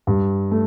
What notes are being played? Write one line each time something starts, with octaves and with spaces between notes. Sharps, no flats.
G2
A3